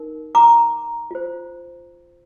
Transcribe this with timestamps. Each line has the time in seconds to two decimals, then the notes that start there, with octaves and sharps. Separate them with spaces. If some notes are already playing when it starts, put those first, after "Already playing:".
Already playing: D#4 A#4
0.35 A#5 D6
1.11 F4 C5